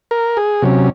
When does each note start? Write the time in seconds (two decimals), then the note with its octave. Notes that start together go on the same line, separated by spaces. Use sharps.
0.11 A#4
0.37 G#4
0.62 C3 F#3 C#4